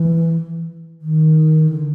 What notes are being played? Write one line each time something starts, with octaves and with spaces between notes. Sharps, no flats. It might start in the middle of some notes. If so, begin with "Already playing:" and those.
Already playing: E3
D#3
D3